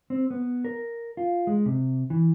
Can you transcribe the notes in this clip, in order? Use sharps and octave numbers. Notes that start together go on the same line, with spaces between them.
C4
B3
A#4
F4
G#3
C3
E3